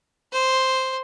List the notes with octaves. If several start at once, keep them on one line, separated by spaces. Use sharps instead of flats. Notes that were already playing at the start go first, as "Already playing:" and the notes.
C5